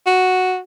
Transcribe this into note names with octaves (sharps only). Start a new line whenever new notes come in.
F#4